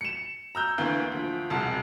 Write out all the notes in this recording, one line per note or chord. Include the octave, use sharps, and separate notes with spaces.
C#7 E7
A#5 E6 G6
D2 E3 A#3 G6
D2 F3
E1 C2 A5